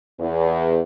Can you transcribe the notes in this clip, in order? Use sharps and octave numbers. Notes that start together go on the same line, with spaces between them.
E2